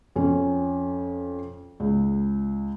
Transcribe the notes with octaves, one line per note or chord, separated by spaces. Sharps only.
F2 C#4
C#2